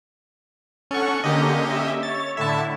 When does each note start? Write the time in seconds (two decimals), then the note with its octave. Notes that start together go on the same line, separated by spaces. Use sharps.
0.91 C#4 A4 F#5 C#6
1.24 D3 A#3 C#4 G4 D#5
1.70 E5
2.03 C#5 A6
2.37 A2 D3 E4 E5 A5